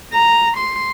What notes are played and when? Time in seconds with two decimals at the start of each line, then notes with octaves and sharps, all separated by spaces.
0.13 A#5
0.57 C6